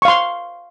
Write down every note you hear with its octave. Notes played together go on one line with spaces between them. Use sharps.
F5 C6 C#6